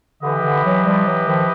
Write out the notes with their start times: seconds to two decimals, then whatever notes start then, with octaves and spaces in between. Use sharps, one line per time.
0.22 D3 E3 E4 G4 B4 D#5
0.43 D3 E3
0.64 E3 F#3
0.85 F3 G3
1.06 E3 F#3
1.27 D#3 F3